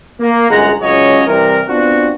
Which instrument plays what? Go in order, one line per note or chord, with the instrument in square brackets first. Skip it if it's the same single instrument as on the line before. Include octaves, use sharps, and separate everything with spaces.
[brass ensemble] A#3
G1 F#2 G#3 G#4 F#5 A#5
C#2 C#3 F#3 C#4 C#5 D#5
C2 C3 E3 G3 A#4
B3 C4 D4 F4 F#4